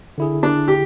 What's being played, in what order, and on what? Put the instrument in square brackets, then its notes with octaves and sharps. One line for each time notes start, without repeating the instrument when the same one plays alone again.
[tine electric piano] D3 E4 G#4
[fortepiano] D4
G4